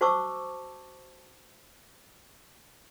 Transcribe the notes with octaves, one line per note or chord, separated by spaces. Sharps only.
F#4 C5 A5 C#6 D6 E6